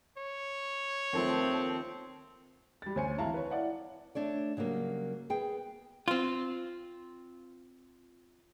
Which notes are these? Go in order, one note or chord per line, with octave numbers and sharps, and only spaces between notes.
C#5
D#2 F3 A3 C4
G3 A6
D2 C#4 C5 G#5 C#7
G#1 E3 E4 F5 A5 A#5
B4 C#5
E4 D5 F5 F#5
A3 D4 C#5 D5
C#3 F#3 G3 A#3
B3 G#4 G5
C4 F4